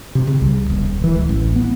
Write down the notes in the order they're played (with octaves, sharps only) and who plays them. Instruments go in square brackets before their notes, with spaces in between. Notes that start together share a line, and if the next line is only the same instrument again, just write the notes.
[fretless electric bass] C3
C#3
C2
D#1
E3
C#2
A1
B3